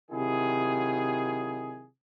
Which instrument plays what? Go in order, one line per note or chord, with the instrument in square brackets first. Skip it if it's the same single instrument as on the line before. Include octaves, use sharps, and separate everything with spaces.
[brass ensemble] C3 D#3 F#3 E4 G#4